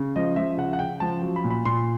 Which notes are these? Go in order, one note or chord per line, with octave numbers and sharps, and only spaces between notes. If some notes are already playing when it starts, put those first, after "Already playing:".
Already playing: C#3
F3 D#5
F3 E5
C#3 F#5
F#5
C#3 G5
F3 A5
F#3
B5
A#2
B5
A#2 C6